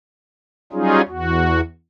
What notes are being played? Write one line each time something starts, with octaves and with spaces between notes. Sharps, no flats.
F#3 G3 C#4 D#4 F4 G#4
E2 F#4